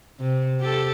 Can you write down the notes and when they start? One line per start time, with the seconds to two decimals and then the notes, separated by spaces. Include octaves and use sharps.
0.20 C3
0.60 G4 A4